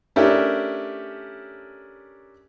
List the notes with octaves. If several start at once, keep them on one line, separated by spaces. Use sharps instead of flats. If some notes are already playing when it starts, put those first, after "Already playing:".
A3 C#4 D4 E4 G4 A#4